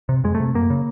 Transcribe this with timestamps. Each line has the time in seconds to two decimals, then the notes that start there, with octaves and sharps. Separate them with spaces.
0.09 C3
0.24 F2 G#3
0.35 A3
0.40 C3
0.54 F#2 A#3
0.70 C#3